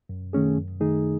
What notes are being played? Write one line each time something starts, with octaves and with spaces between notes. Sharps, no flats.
F#2
D#3 A3 C#4 G#4
F#2
D#3 A3 D#4 G#4